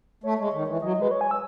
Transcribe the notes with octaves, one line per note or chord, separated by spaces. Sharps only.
A3 C#5
G#3
D#3
E3
F#3 D#5
D#5
G#3 B4
C#5
G#5
E6